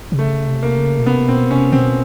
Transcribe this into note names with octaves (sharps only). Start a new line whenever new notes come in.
C3
C#3 A3
C3
A#3
C#3
B2
C3 B3
B2 C4
C3 C#4
B2 C4